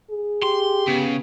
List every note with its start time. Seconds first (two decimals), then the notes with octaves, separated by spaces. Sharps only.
0.10 G#4
0.42 G4 C6
0.87 C#3 B3